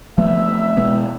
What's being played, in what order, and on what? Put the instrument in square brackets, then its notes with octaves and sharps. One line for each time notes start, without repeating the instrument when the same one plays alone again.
[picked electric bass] F3 A3 B3 [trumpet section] E5
[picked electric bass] B2 G#3 B3